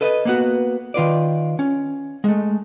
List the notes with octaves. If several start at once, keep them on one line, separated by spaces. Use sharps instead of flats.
A4 B4 D#5
A#3 B3 F#4
D#3 F4 B4 D5
C#4
G#3 A3